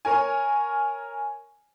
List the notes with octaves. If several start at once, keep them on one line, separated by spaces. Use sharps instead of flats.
A#4 C#5 G#5